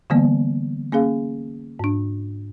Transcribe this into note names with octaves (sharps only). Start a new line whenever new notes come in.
D3 E3 G3 A#3 B3
A#3 C#4 G#4 F5
G#2 D4